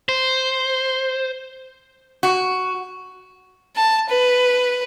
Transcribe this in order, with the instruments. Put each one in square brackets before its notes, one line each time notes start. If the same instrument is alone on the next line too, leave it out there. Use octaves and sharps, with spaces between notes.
[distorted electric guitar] C5
[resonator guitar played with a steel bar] F#4
[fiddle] A5
B4